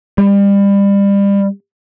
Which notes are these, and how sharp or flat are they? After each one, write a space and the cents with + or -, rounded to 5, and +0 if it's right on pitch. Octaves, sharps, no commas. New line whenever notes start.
G3 +30